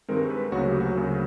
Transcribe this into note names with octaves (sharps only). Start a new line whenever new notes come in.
G2 D#3 G#3 C4 A#4
B4
D2 C#3 F#3 A#3 F#4
G4
F#4
D2 C#3 F#3 A#3